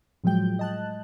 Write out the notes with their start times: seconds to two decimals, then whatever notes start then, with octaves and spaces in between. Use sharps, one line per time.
0.24 A2 F3 F#3 G#3 G5 G6
0.59 D#5 A5 F#6